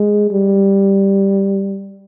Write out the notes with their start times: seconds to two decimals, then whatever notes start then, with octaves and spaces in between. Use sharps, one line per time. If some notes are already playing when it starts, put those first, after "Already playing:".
Already playing: G#3
0.31 G3